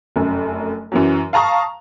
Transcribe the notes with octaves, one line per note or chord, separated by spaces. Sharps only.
F1 F#2
F#2 E3 F#3
F5 A5 A#5 C#6 D#6